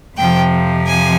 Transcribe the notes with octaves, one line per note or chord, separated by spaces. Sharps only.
F2 C3 F3 G5
G#5